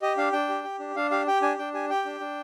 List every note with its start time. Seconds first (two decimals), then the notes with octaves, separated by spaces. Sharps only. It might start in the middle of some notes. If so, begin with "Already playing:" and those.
0.02 G4 D#5
0.17 D4 F5
0.33 D4 G5
0.49 G4
0.64 G4
0.80 D4
0.96 D4 F5
1.11 G4 F5
1.27 G4 G5
1.42 D4 G#5
1.58 D4 G5
1.74 G4 G#5
1.90 G4 G5
2.05 D4
2.20 D4